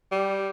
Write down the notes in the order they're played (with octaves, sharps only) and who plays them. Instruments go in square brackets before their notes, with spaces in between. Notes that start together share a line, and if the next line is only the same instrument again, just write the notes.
[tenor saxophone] G3